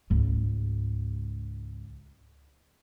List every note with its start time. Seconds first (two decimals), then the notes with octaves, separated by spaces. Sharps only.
0.10 C#2 G#2